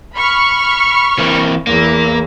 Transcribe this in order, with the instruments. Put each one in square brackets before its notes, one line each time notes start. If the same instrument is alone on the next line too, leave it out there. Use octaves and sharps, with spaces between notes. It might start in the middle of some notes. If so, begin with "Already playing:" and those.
[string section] B5 C#6 F6
[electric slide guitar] E3 A#3 C4
[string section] E2 [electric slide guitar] A#3